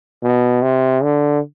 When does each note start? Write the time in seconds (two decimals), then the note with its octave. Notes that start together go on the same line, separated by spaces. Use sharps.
0.23 B2
0.62 C3
1.03 D3